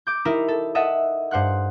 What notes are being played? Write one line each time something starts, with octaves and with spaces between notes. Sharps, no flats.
D6 G6
D#4 E4 G4 A#4
A4
A4 D#5 E5 F#5
G2 C5 F#5 F#6